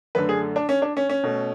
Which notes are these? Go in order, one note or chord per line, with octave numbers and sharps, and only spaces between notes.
F#2 D3 A3 B4
G#4
D4
C#4
D4
C#4
C#4
B2 A3